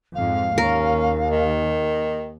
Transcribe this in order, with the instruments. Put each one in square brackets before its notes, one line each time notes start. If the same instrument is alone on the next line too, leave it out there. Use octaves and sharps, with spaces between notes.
[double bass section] F2 G#2 [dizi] F5
[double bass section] D#2 [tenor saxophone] C#4 [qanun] A#4
[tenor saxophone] D#3